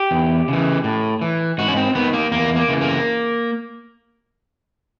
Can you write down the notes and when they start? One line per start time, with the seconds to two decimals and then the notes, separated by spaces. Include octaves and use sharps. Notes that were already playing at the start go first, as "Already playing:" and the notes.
Already playing: G4
0.11 E2
0.48 C#3 E3
0.84 A2
1.21 E3
1.58 G#2 F#4
1.68 C#4
1.77 C4
1.95 D#3 B3
2.13 A#3
2.32 E2 A#3
2.56 A#3
2.69 C#3 E3
2.81 A#3